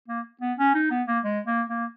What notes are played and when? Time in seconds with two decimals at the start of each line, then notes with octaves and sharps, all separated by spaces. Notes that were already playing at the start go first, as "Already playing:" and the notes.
0.08 A#3
0.41 B3
0.58 C#4
0.74 D#4
0.91 B3
1.07 A#3
1.24 G#3
1.47 A#3
1.69 A#3